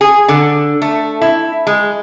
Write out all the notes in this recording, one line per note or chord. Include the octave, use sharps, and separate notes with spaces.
G#4
D3
A3
E4
G#3